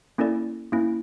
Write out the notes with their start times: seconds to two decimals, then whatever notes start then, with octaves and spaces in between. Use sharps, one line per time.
0.18 A#3 C#4 E4 A4 D5
0.72 A#3 C#4 E4